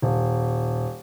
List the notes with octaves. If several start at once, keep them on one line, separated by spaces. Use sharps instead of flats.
D#1